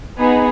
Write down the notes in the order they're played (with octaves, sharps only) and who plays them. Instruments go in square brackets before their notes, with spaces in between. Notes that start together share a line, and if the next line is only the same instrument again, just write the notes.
[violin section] B3 D#4 G#4